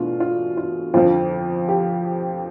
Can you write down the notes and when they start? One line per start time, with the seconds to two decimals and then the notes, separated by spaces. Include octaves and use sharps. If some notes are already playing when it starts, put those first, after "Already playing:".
Already playing: E2 B2 A3 D4 F4
0.20 F4
0.57 F4
0.94 F2 D3 F3 F4
1.68 G4